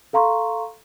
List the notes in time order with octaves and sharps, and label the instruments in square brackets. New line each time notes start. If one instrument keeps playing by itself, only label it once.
[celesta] A4 F5 A#5 C6 C#6